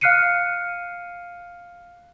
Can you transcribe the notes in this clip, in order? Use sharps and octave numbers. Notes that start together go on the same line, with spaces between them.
F5 F6 F#6 C7 C#7 D#7